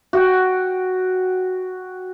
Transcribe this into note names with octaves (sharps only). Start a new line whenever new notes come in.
F#4 F#5 G5